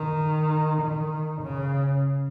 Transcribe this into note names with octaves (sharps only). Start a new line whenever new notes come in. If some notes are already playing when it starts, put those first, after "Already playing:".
Already playing: D#3
D#3
C#3